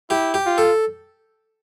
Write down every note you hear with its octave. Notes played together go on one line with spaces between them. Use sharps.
E4 G4
G4
F4
A4